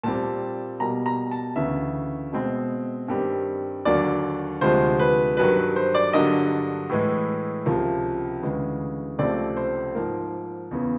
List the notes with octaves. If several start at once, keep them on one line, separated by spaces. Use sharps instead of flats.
A#2 G3 C4 A5
B2 G3 A#3 A#5
A#5
A5
D2 C#3 E3 E5
B2 G#3 C4
G2 D#3 G3 C4
D#2 D3 F#3 A#3 D5
D2 C3 F3 G#3 C5
B4
G2 D#3 F#3 B4
B4
C5
D5
G2 D3 F#3 A#3 D#5
A2 E3 G#3
C#2 C3 F3 A#3
D2 C#3 E3 G#3
C#2 C3 F3 A3 C4 D5
C5
G#2 F3 A#3
E2 C#3 E3